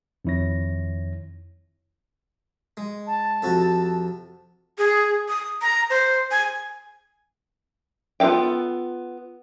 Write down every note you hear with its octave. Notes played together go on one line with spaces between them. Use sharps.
F2 D#3 E4 C#5 A#6
G#3
A5
F2 C3 F#4
G#4
D#6
A#5
C5
G#5
B3 F4 A4 F5 G5